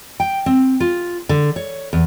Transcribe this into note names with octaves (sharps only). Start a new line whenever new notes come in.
G5
C4
F4
D3
C#5
E2